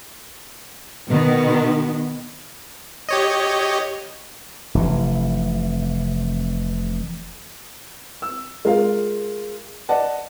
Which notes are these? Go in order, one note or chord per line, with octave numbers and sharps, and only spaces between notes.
B2 D#3 B3
G4 C#5 D#5
F1 C3 E3
E6
G#3 F4 A#4 F5
D5 D#5 F#5 A5